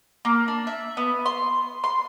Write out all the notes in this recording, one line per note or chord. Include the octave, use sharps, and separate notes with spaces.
A#3
D4
E5
B3
C6
C6